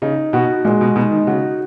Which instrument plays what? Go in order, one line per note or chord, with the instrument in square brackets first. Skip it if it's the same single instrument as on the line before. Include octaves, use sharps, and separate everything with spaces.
[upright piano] C#3 [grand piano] D#4
[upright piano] B2 [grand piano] F#4
[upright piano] A#2 [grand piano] G#3
[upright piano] B2
[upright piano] B2 [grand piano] D#4
[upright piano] D#3
[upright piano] C#3 [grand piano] F#4